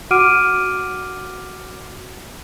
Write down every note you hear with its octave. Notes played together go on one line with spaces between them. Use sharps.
F#4 F#5 D6 F6 D7 D#7